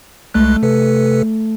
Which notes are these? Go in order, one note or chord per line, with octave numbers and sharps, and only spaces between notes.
C2 G#3 A3 F#6
C3 A4 B4